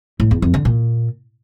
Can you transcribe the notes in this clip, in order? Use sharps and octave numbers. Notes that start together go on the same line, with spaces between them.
A2
E2
F2
D3
A#2